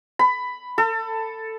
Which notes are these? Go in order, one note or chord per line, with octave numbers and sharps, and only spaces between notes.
B5
A4